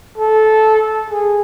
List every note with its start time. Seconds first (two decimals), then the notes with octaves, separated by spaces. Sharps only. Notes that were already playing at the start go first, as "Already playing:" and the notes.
0.18 A4
1.10 G#4